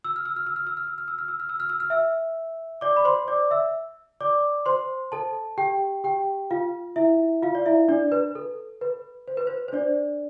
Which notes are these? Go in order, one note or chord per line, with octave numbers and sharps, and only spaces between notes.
E6
F6
E6
F6
E6
F6
E6
F6
E6
F6
E6
F6
E6
F6
E6
F6
E6
F6
E5 E6
D5 D6
B5
C5 C6
D5 D6
E5 E6
D5 D6
C5 C6
A4 A5
G4 G5
G4 G5
F4 F5
E4 E5
F4 F5
D5
E4 E5
D4 D5
B4
A4
B4
C5
B4
C5
C5
D4 D5